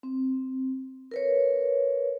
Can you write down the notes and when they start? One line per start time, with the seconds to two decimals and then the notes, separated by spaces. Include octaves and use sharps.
0.03 C4
1.11 A#4 B4 C#5